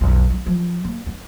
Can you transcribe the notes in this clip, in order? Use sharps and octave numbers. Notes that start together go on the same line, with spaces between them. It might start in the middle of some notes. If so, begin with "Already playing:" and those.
B1 F2
A3 B3
F3
A#3 B3
B3 C4